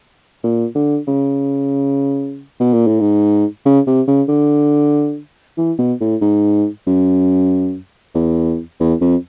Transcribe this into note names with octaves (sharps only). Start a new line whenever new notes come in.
A#2
D3
C#3
B2
A#2
A2
G#2
C#3
C3
C#3
D3
E3
B2
A2
G#2
F#2
E2
E2
F2